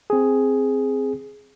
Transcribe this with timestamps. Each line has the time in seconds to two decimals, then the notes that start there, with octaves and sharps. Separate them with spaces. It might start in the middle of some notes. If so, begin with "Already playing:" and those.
0.10 C4 G#4